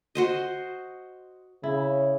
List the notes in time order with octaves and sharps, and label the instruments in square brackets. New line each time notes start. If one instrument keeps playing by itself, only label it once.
[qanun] F#4 C5 D#5
[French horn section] C#3 [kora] E4